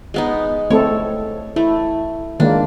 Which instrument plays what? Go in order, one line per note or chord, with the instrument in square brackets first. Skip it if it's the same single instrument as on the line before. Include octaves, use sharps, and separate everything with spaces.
[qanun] G#3 B3 D#4
[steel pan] A3 C4 A4 [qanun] C#5
[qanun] A3 [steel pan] E4
[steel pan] D#3 G#3 A#3 [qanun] D4